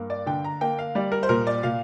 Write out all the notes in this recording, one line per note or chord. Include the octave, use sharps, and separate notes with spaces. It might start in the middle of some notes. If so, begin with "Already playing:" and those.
Already playing: G2 A#3
D5
D3 G5
A#5
A#3 G5
F5
G3 D5
A#4
C5
A#2 A#4
D5
A#2 F5